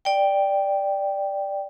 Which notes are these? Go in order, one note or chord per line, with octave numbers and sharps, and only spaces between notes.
D5 G5